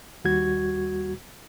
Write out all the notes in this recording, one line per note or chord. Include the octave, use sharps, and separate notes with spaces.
D#2 G3 F#4 G#6